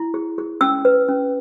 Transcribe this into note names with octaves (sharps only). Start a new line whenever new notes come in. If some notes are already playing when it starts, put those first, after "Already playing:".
Already playing: E4
G#4
G#4
C#4 E6
B4
C#4